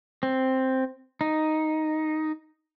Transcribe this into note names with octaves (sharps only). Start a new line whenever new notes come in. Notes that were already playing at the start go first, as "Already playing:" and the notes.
C4
D#4